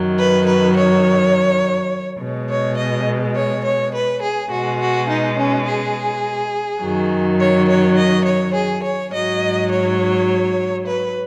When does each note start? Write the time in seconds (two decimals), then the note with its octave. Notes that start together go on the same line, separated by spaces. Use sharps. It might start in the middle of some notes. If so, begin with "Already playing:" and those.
Already playing: F#2 D#3 F#3
0.17 B4
0.46 B4
0.76 C#5
2.19 B2 G#3
2.49 C#5
2.78 D#5
3.35 C#5
3.64 C#5
3.94 B4
4.22 G#4
4.51 B2 G#3 F#4
4.80 F#4
5.09 D#4
5.37 C#4
5.67 G#4
6.81 F#2 D#3 F#3
7.40 C#5
7.69 C#5
7.97 D#5
8.26 C#5
8.54 G#4
8.83 C#5
9.13 G#2 F#3 D#5
9.71 C#5
10.86 B4